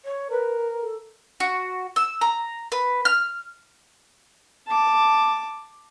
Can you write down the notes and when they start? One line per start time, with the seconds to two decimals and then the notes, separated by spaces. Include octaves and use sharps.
0.04 C#5
0.30 A#4 B4
0.81 A4
1.40 F#4
1.96 E6
2.21 A#5
2.72 B4
3.05 F6
4.67 A5 D6